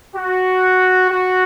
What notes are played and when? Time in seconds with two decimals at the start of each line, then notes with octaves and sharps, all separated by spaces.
0.15 F#4
1.10 F#4